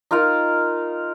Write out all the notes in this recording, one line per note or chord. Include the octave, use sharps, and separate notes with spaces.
D#4 F4 A#4 F5